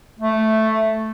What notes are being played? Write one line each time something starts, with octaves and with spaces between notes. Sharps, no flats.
A3